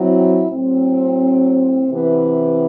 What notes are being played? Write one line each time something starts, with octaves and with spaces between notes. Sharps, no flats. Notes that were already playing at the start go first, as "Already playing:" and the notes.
Already playing: F#3 C4 E4
A2 F#3 C4
C3 E3 B3